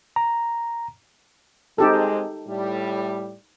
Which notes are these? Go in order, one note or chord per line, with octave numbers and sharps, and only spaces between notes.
A#5
G#3 C4 D#4 G4 A4
A2 G3